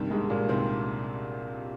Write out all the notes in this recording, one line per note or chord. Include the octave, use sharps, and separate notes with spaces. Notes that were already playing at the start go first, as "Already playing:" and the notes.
Already playing: C2 G2 C3 D#3 G3
G#2 G#3
A#2 A#3
C2 C3 D#3 C4